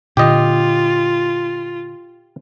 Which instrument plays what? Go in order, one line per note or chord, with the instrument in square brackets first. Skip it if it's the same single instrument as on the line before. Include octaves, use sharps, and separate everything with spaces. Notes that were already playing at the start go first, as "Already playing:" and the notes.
[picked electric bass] A#2 D3 [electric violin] F4 [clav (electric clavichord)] G4 D#5